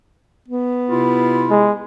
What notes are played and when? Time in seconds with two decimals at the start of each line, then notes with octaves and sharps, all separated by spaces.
0.48 B3
0.89 C3 E4 F4
1.50 G#3